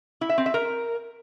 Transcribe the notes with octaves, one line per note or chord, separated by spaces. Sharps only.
E4
E5
C4
E5
A#4